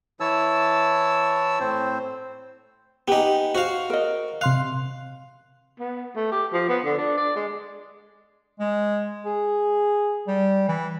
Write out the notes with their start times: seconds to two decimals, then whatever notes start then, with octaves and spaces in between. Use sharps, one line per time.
0.20 E3 E4 C#5 A5 E6
1.60 A2 C4 C5
3.08 B3 D#4 G4 G#5
3.55 F#4 C5 F5
3.90 A#4 D#5
4.41 C3 F5 C6 F#6
5.80 B3
6.16 A3
6.32 G4
6.53 F3
6.69 B3
6.84 D3
6.98 D4
7.17 D5
7.36 G#3
8.60 G#3
9.26 G#4
10.27 G3
10.68 E3